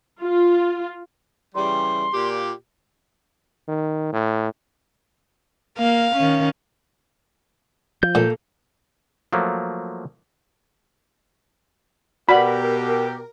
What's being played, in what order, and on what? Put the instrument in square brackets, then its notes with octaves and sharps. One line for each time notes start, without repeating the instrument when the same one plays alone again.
[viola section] F4
[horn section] C#3 E3 G3 [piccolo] C6
[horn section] A#2 G4
[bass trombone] D#3
A2
[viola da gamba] A#3 [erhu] F5
[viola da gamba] D#3 C#4
[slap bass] F3 [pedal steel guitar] G6
[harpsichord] A#2 [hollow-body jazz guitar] A#3 A4
[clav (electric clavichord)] F3 F#3 A3 A#3
[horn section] B2 G4 [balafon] F#4 D5 F#5 [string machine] A#4 [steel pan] B5